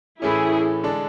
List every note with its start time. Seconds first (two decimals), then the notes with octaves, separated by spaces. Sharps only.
0.22 A2 E3 A3 C#4 E4 G#4
0.83 D3 G#3 D4 A4